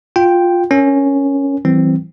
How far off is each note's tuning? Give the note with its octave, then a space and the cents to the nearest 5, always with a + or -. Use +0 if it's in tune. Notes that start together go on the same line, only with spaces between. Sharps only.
F4 +10 G5 +0
C#4 +0 A#4 +0
E3 +0 G3 -35 C4 +0